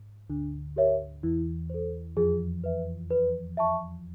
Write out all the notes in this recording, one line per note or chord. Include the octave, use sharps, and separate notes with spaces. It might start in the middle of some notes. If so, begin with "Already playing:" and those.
Already playing: G#2
D2 D3 D4
G4 A#4 C#5 E5
E2 E3 E4
A4 C5
F2 F3 G#4
B4 E5
B4
E5 A5 C#6